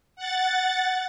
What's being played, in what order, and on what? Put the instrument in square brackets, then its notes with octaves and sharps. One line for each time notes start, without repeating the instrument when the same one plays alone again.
[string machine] F#5 A6